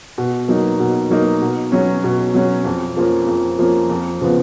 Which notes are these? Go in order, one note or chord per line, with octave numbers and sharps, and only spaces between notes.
B2
F#3 A#3 D#4
B2
F#3 A#3 D#4
B2
F#3 C#4
B2
F#3 C#4
F2
F3 A#3 C#4
F2
F3 A#3 C#4
F2
C#3 F3 B3